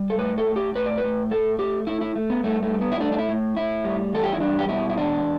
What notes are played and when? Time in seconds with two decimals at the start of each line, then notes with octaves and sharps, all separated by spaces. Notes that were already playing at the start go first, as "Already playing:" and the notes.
Already playing: G3
0.10 A4
0.18 A2 B4
0.38 A4
0.46 A2
0.56 G4
0.75 A2 B4
0.86 D5
0.98 B4
1.03 A2
1.31 A3 A4
1.59 A3 G4
1.87 A3 E4
2.01 E4
2.16 A3
2.30 B3
2.44 G2 A3
2.63 A3
2.72 G3
2.81 B3
2.92 E4
3.00 A3 D4
3.12 D4
3.18 E4
3.29 A2
3.57 A2 E4
3.84 G3
4.13 E2 A4
4.23 G4
4.33 E4
4.40 G3 D4
4.59 G4
4.69 B2 E4
4.90 E4
4.98 E2 D4